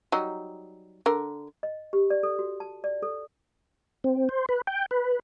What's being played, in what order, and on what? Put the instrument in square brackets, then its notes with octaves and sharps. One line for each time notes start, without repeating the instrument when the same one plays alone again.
[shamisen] F#3 G3 D#4
D3 A#4
[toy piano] D#5
G4
D5
A4
F#4
A5
D5
A4
[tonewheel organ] C4
C5
B4
G5
B4